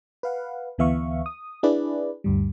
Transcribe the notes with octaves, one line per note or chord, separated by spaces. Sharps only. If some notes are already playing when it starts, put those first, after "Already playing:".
B4 F5 F#5
D2 E3 B3 E5 F5 C#6
D#6
D4 E4 G#4 B4 D5
D2 G2 G3